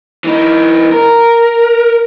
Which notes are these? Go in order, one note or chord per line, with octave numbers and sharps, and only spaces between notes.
E3 D#4
A#4